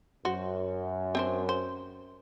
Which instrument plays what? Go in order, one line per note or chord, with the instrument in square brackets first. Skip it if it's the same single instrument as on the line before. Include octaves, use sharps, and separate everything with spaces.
[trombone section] F#2 [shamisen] F#4 C5
[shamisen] C4 D4 C5
C5